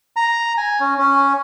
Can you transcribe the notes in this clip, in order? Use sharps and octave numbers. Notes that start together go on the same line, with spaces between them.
A#5
G#5
C#4
C#4